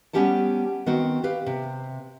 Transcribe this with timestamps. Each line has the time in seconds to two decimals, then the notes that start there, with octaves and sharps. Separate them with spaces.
0.13 G3 B3 C#4 G4 F#5 A5
0.86 D#3 B3 C4 F#4
1.24 G4 B4 F5
1.46 C3